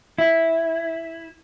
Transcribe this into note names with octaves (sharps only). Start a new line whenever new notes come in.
E4